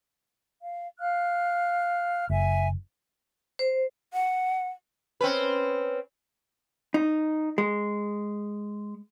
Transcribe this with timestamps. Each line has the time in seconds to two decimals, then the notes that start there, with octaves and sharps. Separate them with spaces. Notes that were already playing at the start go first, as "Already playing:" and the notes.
0.62 F5
0.98 F5 F6 F#6
2.30 F#1 E5 G#5
3.59 C5
4.13 F#5
5.21 C4 C#4 B4
6.94 D#4
7.58 G#3